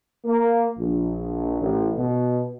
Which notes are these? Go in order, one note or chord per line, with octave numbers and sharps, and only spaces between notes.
A#3
A#1
A1
B2